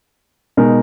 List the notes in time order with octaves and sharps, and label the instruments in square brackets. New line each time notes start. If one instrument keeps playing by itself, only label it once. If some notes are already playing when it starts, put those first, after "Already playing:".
[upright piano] B2 G#3 D#4 A#4